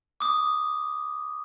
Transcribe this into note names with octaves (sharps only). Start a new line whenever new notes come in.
D6 D#6